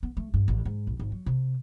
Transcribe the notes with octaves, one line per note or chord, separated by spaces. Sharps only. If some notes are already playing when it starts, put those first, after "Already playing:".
B3
A3
G2
A1
G#2
A#1
G#1
F#3
C3